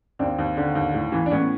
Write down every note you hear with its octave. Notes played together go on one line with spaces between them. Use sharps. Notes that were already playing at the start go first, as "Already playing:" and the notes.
D#2 C4 D4
D#2
D3
D#2
A2
E3
D4
A2 B3 C#4